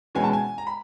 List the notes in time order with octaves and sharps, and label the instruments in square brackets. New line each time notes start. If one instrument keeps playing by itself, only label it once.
[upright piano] E2 B2 G#3 C#4 G#5
A5
G#5
A#5
B5